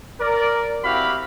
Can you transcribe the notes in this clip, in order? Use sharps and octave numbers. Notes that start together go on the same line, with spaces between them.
A#4 D5
C4 E4 F#4 G4 F5 B5